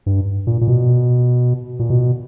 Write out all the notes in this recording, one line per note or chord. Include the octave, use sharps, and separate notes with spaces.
G2
A#2
A#2
B2
A#2
B2